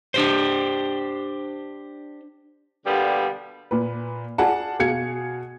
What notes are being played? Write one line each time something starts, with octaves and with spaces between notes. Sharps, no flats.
D4 G4 C5
B2 D3 G3 A#3 B3 G4
A#2 B4
F4 G#4 D5 F#5 A5
B2 G#4 F5 G#5 G#6 C#7